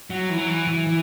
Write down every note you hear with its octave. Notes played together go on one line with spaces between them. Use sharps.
F#3
E3
F#3
E3
E3
E3